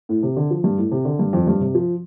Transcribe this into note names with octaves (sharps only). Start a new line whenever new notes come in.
A2
C3
D3
F3
G2
A2
C3
D3
G2
F2
G2
C3
F3